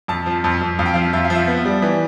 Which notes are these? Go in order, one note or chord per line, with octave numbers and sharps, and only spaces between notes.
F2 A5
F3
F2
F2
F2 F5
G5
F3 F5
F2 E5
F5
F3
E5
B3
G3
E3